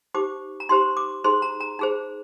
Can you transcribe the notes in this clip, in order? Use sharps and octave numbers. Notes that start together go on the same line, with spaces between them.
D#4 G4 C5 D6
A#5
D#4 G4 C5 C6
D6
D#4 G#4 C5 C6
A#5
A#5
D#4 G#4 C5